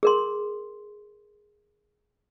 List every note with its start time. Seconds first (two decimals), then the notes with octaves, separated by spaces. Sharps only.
0.03 G#4 A#4 C6